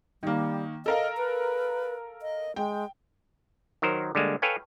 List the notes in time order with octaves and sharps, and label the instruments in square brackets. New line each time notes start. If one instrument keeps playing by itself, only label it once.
[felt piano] D#3 A#3 [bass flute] G3
[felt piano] A4 A#4 F5 [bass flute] D#5
[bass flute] B4
D#5
[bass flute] G#3 [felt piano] G5
[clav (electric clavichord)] D#3 F#3 A#4 C5
D3 G3 G#3 A#3
A4 B4 C#5 F5 G5 G#5